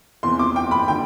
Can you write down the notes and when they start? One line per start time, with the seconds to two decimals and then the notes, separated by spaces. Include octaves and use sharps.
0.23 E2 C3 E3 C6
0.39 D6
0.56 G5
0.71 B5
0.88 D3 G5